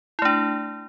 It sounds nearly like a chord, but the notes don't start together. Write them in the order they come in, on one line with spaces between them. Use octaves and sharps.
E4 A3 D4